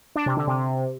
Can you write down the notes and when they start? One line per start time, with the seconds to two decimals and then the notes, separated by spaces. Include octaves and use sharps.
0.16 D4
0.26 C3
0.37 D3
0.47 C3